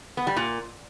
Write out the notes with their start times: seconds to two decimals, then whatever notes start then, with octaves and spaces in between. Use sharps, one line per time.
0.17 B3
0.27 G3
0.37 A#2